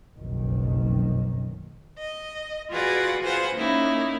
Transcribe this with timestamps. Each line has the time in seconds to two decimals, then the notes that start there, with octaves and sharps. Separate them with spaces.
0.17 F#1 B1 F2 D#3
1.98 D#5
2.70 F4 F#4 G#4 B4 D5 F#5
3.23 F4 G#4 B4 C5 F#5
3.55 A#3 C#4 D#4 E4